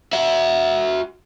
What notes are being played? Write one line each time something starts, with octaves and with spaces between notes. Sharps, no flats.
F#4 E5